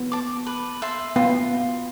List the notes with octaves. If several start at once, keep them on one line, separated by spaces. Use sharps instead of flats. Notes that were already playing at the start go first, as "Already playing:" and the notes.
Already playing: B3
A5 D6
B4
E5 A5 C6
B3 F4